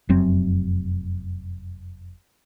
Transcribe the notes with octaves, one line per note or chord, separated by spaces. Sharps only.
F1 F#2 F#3 C4